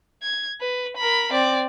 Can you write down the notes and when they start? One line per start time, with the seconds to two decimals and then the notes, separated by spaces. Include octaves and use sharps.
0.23 G#6
0.61 B4
0.97 A#4 B5
1.32 C4 D5